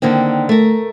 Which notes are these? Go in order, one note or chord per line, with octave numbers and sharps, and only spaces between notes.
D3 D#3 A#3 C4
A3 A#4